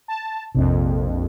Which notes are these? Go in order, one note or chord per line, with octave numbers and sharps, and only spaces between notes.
A5
A#1 F2 C3